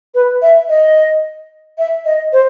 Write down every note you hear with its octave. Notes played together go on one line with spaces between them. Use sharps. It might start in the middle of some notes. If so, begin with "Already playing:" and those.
B4
E5
D#5
E5
D#5
C5